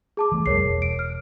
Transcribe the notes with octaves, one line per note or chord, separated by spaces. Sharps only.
G#4 A5 D6
E3 A3
C2 F2 G3 A#4 C#5 C7
E1
D7
F6